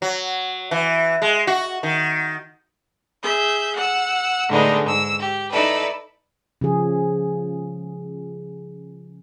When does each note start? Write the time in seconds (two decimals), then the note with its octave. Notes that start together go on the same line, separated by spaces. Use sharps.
0.02 F#3
0.71 E3
1.22 G#3
1.47 F#4
1.83 D#3
3.22 G#4 E5 G6
3.75 F#5 E6
4.48 A2 D3 G#3 B3 D4 D#4
4.85 G#2 E6
5.19 G4
5.51 D#4 E4 A4 B4 D5
6.61 C#3 F3 G#4